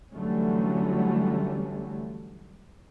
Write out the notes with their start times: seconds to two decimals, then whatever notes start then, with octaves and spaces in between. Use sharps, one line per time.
0.13 D3 E3 F#3 G3 A3 C#4